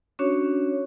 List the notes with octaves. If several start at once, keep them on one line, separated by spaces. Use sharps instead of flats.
C#4 D4 F#4 C#5